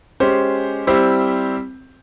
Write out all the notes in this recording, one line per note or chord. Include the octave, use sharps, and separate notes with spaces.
G#3 C#4 G4 C5
G3 C4 E4 G4 C5